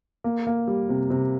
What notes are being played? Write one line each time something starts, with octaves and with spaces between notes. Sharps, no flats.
A#3
A#3
G3
C3
C3